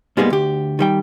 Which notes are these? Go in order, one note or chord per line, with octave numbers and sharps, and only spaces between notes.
G#2 G3 G#3 A#3 B3
D2 G4
D#3 G3 G5